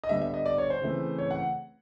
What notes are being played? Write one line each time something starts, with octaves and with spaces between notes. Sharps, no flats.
D#5
D3 G3 B3 E5
E5
D#5
D5
C#5
C5
C#3 E3 A3 C4
C#5
F#5